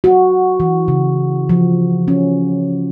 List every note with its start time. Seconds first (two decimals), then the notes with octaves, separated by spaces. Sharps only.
0.04 F#4
0.60 E3
0.88 C#3
1.49 F3
2.08 C#4